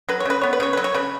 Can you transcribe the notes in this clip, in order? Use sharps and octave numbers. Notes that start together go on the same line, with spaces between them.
F#3 B4
C#5
C#3 B4
B3 C#5
B4
C#3 C#5
F#3 B4
C#5
C#3 B4